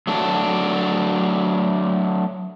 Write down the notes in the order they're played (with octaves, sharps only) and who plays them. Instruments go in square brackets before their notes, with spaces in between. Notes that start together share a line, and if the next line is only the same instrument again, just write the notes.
[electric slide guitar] F#3 A3 D4